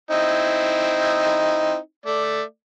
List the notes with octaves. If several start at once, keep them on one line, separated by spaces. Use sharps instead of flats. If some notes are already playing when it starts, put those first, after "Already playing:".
C4 D#4 E4
A3 D5